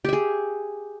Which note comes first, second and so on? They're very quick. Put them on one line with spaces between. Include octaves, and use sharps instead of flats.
G4 E5 G#4